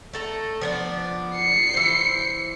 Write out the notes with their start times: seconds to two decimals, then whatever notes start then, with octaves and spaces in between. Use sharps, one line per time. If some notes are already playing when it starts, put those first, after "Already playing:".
0.14 A3 A4 A#5
0.61 F3 B3 D4
1.35 C7 C#7
1.74 E3 C5